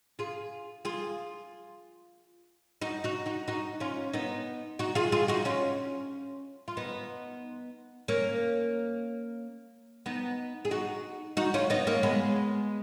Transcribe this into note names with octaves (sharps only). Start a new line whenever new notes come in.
F4 G#4
F4 G#4
D#4 F#4
D#4 F#4
D#4 F#4
D#4 F#4
C#4 F4
B3 D#4
D#4 F#4
F4 G#4
F4 G#4
D#4 F#4
C#4 F4
F4
B3 D#4
A#3 C#4
B3 D#4
G#4
D#4 F#4
D#4 F#4
C#4 F4
B3 D#4
A#3 C#4
G#3 B3